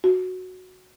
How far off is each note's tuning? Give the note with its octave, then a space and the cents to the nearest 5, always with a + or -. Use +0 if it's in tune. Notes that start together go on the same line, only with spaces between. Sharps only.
F#4 -5